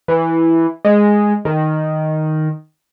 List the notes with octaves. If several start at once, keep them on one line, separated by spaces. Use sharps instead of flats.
E3
G#3
D#3